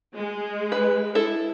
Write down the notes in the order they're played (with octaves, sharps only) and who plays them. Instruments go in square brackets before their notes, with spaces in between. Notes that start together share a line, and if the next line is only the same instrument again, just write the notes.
[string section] G#3
[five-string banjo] B4
E4 A4